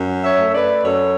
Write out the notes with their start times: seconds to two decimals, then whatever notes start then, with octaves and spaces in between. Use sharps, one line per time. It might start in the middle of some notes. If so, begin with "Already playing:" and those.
Already playing: F#2
0.24 C#5 E5
0.39 A3
0.54 B4 D5
0.84 F#2 A4 C#5